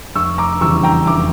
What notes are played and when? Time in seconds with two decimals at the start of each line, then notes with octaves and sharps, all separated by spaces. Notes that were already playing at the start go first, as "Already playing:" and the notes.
0.16 F1 C#6 E6
0.38 A#5 D6
0.61 E2 C#3 E3 G3 C#6 E6
0.83 G5 A#5
1.06 F1 A#5 D6